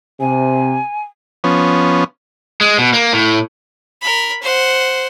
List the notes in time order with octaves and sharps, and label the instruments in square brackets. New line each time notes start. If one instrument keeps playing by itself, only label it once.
[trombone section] C3 [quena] G#5
[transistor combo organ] F3 B3 C#4
[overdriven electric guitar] G#3
B2
A#3
A2
[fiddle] A#4 B5
C5 F#5